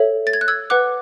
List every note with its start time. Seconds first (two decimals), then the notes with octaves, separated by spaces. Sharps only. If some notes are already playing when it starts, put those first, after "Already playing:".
Already playing: A4 C#5 E5
0.27 A6
0.33 G#6
0.41 F#6
0.48 E6 G#6
0.70 B4 F#5 D6 F#6